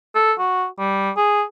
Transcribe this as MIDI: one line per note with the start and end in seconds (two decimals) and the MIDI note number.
0.15 0.33 69
0.39 0.66 66
0.79 1.11 55
1.17 1.43 68